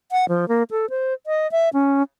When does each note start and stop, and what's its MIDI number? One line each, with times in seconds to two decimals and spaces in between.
0.12 0.25 78
0.29 0.48 53
0.48 0.63 58
0.71 0.89 69
0.90 1.14 72
1.26 1.50 75
1.52 1.69 76
1.74 2.03 61